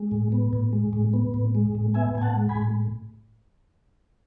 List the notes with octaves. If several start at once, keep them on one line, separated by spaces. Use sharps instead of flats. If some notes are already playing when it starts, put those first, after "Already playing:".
Already playing: G#3
A2
B3
A2
G#3
A2
B3
A2
G#3
A2
B3 E5 G#5
A2 G#5
F#5 A5
G#3
G#5 B5
A2